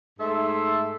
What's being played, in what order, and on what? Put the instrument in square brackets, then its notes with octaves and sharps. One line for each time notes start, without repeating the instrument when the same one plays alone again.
[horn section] G#2 A3 A4 E5 C6